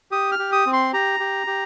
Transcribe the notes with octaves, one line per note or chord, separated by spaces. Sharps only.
G4 D#6
F6
G4
D#6
C4
C6
G4 A#5
G4
G4